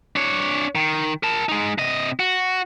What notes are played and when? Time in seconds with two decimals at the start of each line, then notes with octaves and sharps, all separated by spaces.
0.16 D4 C#5
0.75 D#3
1.23 A#4 A5
1.49 G#3 D#4
1.78 C3 D#5
2.20 F#4